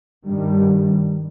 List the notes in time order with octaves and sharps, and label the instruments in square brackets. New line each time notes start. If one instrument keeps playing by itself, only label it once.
[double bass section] G2 D#3 G3